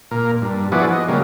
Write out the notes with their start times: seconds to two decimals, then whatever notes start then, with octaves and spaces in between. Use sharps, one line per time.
0.11 A#2 A#4
0.42 G2
0.72 F3 B3 E4 F#4 G#4 D5
0.93 D#5
1.08 C#3 F#3 G3 A#3